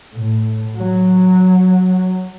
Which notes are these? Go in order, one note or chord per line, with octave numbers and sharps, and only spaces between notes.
A2
F#3